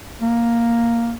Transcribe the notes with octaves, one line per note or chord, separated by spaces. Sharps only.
A#3